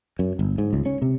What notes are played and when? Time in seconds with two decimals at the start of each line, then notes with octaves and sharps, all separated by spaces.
0.19 F#2
0.39 G1
0.58 G#2
0.73 C#2
0.86 C#4
1.02 C3